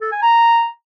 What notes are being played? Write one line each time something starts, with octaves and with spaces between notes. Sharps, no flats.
A4
G#5
A#5